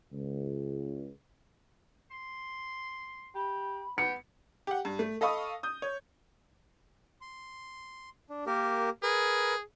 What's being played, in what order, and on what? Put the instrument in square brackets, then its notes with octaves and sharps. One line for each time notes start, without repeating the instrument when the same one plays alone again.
[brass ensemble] C#2
[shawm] C6
[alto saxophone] G4 [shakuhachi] B5
[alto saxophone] B3 [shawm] G4 [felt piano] C#7
[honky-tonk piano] G4 F#5
G2
A3
A4 D#5 F5 B5 C#6 D#6
D#6 G6
C#5
[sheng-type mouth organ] C6
D4
A#3 G4 A#4
[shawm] G#4 [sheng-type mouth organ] A#4 B4